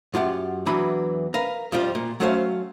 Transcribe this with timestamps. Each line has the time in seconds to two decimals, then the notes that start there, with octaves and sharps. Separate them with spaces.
0.14 F#2 F4 G4 F#5
0.66 E2 E3 F#3 D4 B4 B5
1.34 A#4 B4 F5
1.72 F2 F3 G3 F4
1.95 A#2
2.20 F#3 A3 C#4 C5 E5 F5